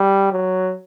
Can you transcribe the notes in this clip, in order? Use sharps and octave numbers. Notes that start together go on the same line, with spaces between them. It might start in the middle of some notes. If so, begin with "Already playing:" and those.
Already playing: G3
F#3